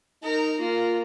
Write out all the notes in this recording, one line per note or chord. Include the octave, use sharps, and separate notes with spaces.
D#4 A#4
A#3 F4